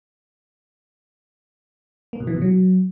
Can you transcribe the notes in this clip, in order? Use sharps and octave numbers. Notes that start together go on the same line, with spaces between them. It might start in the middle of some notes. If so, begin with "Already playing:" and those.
A#3
B2
E3
B2
F#3